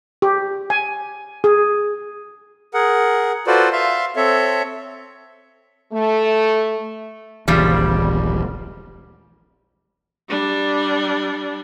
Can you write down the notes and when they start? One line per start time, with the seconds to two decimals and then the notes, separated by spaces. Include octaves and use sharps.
0.22 G4
0.70 G#5
1.44 G#4
2.74 G#4 A#4 F#5
3.47 F4 F#4 A4 B4 C5 D5
3.72 E5 F5 C6
4.16 C4 A4 C#5 E5
5.93 A3
7.48 D#1 A#1 C#3 E3 F3 G3
10.29 G3 D4